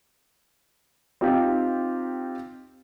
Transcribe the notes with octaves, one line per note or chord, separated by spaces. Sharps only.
C4 D#4 F4 G4